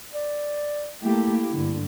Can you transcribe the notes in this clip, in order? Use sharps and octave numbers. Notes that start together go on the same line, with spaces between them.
D5
A3 A#3 E4 G4
G2 D3